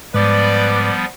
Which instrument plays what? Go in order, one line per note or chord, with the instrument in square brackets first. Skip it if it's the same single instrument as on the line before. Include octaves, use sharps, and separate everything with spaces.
[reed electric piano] G#2 [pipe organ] F3 G3 B3 [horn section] B4 D5